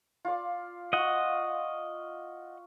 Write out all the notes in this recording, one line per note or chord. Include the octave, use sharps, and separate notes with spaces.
F4 D5
F4 F#4 D#5 F#5